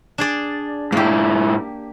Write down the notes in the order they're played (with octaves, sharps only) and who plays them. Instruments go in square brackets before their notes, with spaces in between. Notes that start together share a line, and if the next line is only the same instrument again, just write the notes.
[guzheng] D4 G#4 D5
[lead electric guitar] G#2 E4 [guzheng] A#3 G4